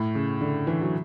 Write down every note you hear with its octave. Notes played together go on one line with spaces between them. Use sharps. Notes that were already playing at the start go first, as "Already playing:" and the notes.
Already playing: A2
C#3
D3
E3
F#3